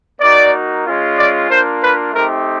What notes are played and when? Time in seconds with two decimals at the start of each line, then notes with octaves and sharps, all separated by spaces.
0.20 A#3 D#4 F#4 D5
0.85 G#3 C#4 F4
1.17 D5
1.48 A#3 D4 F4 C5
1.81 B4
2.13 A3 C4 D#4 G4 A#4